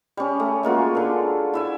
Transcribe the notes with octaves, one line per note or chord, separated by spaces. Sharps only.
G3 C#4
A3
G#3 A#3 F4 F#4
D3 A4
E4 E5 G#5